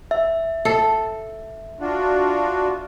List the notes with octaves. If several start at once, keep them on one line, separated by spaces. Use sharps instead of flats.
E5
A4
D4 F4 F#4